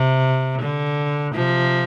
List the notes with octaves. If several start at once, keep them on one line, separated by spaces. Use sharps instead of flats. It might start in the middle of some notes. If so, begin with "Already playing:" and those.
Already playing: C3
D3
C3 F3